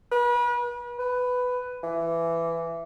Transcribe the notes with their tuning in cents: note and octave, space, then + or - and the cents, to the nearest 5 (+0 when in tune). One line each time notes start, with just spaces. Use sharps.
B4 -35
B4 +10
E3 +15